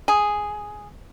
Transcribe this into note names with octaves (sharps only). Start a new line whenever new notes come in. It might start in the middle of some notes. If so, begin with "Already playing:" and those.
G#4